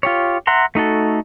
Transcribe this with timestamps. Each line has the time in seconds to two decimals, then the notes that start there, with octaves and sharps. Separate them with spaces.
0.03 F4 G4 C#5
0.47 E5 F#5 A#5 C6
0.75 A3 D#4 F#4 A4